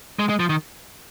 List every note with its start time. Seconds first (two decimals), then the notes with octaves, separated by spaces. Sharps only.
0.19 G#3
0.29 G#3
0.40 F3
0.50 D#3